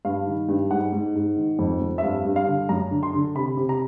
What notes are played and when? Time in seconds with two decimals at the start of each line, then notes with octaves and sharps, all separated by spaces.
0.05 G2 F5
0.27 D#3
0.49 G2
0.70 G#2 F#5
0.92 G#2
1.15 G#2
1.37 D#3
1.59 F2
1.81 F2
1.98 E5
2.03 G2 F5
2.25 G2
2.36 F5
2.47 D3
2.69 F#2 A#5
2.91 D3
3.03 C6
3.14 D3
3.35 C3 B5
3.57 C3
3.69 A#5